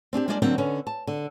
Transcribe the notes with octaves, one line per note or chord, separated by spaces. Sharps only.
C4 D4 F4 G4
G3 G#3 A#3 D4 D5
D3 F#3 A#3 C4 D4
D3 B3 C#4
A5
D3